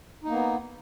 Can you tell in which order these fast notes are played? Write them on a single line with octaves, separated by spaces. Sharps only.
D#4 A#3 B3